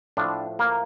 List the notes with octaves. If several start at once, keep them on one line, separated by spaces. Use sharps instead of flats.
A2 F3 D4
A#3